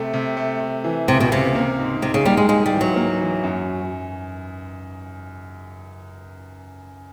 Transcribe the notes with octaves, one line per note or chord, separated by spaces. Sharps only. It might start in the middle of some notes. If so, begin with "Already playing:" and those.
Already playing: C3 A3
C3
A3
A3
E3
C#2 C3
B2
C#2 C3
A#3
G#2
G#2 C3
C#3
G3 A#3
G#3
G#2 G#3
G3
E3
F#3
A#3
E3
F#2